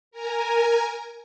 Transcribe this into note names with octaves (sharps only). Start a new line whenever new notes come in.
A#4 G#5 A#5